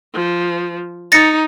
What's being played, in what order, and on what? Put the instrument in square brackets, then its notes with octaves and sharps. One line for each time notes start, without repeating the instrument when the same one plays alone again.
[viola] F3
[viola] D#4 [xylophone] A6 A#6 C#7